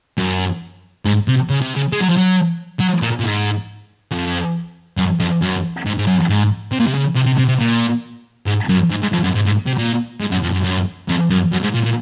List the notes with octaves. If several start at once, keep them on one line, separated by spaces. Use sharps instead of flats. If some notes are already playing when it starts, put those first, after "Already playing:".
F#2
G#2
C3
C#3
C3
C#3
G#3
F#3
F3
F#3
F#3
A#2
A#2
G#2
F2
F#2
F2
F#2
G#2
G#2
F#2
G#2
C3
A#2
C3
C#3
C3
C3
C3
C3
A#2
G#2
F#2
G#2
G#2
F2
F#2
G#2
G#2
C3
A#2
G#2
F#2
F2
F#2
F#2
F2
F#2
F#2
G#2
A#2
A#2